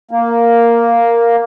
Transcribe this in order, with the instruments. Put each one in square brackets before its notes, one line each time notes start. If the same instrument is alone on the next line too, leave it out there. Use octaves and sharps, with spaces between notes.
[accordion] A#3